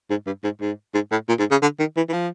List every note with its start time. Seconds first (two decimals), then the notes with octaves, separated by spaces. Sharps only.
0.10 G#2
0.26 G2
0.44 G#2
0.61 G#2
0.95 G#2
1.12 A2
1.28 A#2
1.39 G#2
1.51 C#3
1.62 D3
1.79 D#3
1.97 E3
2.09 E3
2.13 F3